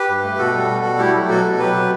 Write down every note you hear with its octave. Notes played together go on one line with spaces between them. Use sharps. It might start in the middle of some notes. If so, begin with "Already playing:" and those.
Already playing: G4 B4
G2
A3
B2 F#4 A4
G3
B2
G3
A3 E4 G4
F#3
B2 F#4 A4
B2
F#3 G4 B4
C3